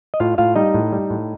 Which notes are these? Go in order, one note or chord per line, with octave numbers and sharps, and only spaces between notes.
D#5
A2 F4 F5
A2 F4 F5
G3 D#4 D#5
A2
G3
A2